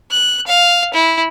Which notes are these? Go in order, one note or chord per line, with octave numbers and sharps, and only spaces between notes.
F#6
F5
E4